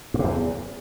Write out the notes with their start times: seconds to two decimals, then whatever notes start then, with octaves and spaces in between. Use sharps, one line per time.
0.14 G2
0.19 C3
0.24 E2